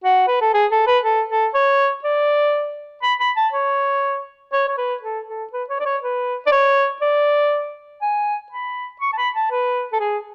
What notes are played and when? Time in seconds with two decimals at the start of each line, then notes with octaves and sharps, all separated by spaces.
0.04 F#4
0.28 B4
0.41 A4
0.54 G#4
0.71 A4
0.87 B4
1.04 A4
1.29 A4
1.54 C#5
2.04 D5
3.02 B5
3.20 B5
3.36 A5
3.53 C#5
4.52 C#5
4.68 C#5
4.77 B4
5.02 A4
5.27 A4
5.52 B4
5.69 C#5
5.80 D5
5.85 C#5
6.02 B4
6.46 D5
6.52 C#5
7.01 D5
8.02 G#5
8.52 B5
9.01 C#6
9.13 A5
9.17 B5
9.35 A5
9.51 B4
9.93 A4
10.00 G#4